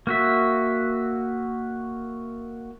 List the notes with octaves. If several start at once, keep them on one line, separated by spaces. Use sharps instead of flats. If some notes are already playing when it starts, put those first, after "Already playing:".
A#3 F#4 E5